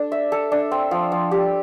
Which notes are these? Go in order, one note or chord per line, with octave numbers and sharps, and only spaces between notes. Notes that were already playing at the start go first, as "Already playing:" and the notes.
Already playing: D4 A4
E5
A4
D4
C4
F3
F3
G4